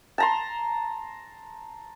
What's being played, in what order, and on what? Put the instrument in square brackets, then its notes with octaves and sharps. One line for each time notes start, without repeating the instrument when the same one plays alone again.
[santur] A5 A#5 C6